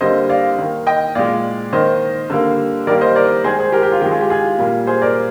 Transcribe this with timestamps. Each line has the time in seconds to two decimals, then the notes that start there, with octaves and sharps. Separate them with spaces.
0.01 D3 G3 A#3 C5 D#5
0.29 D5 F5
0.58 D#3 A#3
0.87 D#5 G5
1.15 A#2 G#3 D5 F5
1.73 D#3 A#3 C5 D#5
2.30 D3 G3 A#3
2.87 D#3 G3 A#3 A#4 D5
3.01 C5 D#5
3.16 A#4 D5
3.44 D#3 G#3 G#4 C5
3.59 G#4 C5
3.72 G4 A#4
3.83 G4
3.92 F4
4.02 D#3 G#3 G4
4.11 F4 G#4
4.21 G4
4.30 F4 G#4
4.58 A#2 G3 A#3
4.87 G#4 C5
5.02 A#4 D5